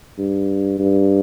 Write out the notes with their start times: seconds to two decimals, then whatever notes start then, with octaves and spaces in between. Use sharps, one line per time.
0.18 G2
0.79 G2